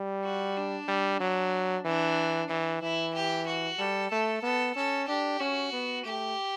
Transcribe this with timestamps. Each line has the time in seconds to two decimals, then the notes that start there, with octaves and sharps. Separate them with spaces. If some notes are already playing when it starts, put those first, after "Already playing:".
Already playing: G3
0.24 F#4
0.57 D4
0.88 G3
1.20 F#3 D4
1.85 E3 D4
2.49 E3 D4
2.81 E3 E4
3.14 G4
3.47 F#4
3.79 G3 A4
4.11 A3 A4
4.43 B3 A4
4.76 C#4 A4
5.08 D4 G4
5.40 C#4 F#4
5.72 B3
6.05 A3 G4